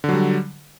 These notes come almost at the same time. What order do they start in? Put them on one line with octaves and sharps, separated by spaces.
D3 F#3 G3